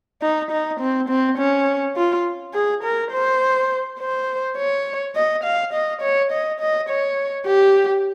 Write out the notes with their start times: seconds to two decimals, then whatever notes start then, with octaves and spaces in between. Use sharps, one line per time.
0.22 D#4
0.51 D#4
0.80 C4
1.09 C4
1.38 C#4
1.96 F4
2.54 G#4
2.84 A#4
3.12 C5
4.00 C5
4.57 C#5
5.16 D#5
5.44 F5
5.73 D#5
6.02 C#5
6.32 D#5
6.60 D#5
6.89 C#5
7.47 G4